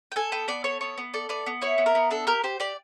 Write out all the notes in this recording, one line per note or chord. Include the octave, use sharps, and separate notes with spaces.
G5
A4 G#5
B3 G5
B3 D5
A4 C#5
B3 C#5
B3
A4 D5
B3 D5
B3
E4 C#5
B3
A#4
B3
D4 A4
G4 A#4
G4 C5
G4 D5